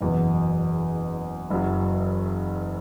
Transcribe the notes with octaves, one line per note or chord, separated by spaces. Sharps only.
F#1 E2 B2
F#1 F#2 F#3